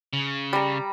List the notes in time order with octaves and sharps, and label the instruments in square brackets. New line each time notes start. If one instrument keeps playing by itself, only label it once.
[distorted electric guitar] C#3
[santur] G3 A#5